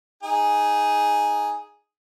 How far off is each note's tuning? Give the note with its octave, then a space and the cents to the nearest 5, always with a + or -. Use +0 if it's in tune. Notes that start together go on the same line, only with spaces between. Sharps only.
D#4 +0 G#4 +0